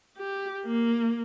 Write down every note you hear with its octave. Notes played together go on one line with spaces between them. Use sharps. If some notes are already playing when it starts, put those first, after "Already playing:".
G4
A#3